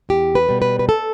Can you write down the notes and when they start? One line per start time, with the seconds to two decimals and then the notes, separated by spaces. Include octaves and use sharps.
0.09 E2 G4
0.35 B4
0.49 B2 G3
0.62 B4
0.79 B4
0.89 A4